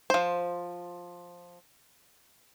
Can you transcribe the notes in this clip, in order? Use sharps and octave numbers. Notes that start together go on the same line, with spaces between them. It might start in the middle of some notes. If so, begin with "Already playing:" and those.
F3 C5